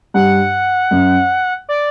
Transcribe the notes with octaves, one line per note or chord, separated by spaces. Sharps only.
G2 F#5
F#2
D5